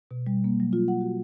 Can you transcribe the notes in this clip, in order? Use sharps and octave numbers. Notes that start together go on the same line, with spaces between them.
B2
G3
A#3
F#3
F4
F#5
F#4